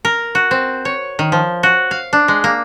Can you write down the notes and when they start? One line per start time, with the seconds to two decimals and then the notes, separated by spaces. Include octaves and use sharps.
0.05 A#4
0.35 F#4
0.51 C4
0.85 C#5
1.19 D#3
1.32 F3
1.63 F#4
1.91 F5
2.13 D4
2.28 G#3
2.44 A#3